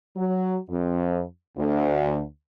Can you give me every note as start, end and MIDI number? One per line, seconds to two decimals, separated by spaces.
0.16 0.56 54
0.69 1.22 41
1.56 2.19 38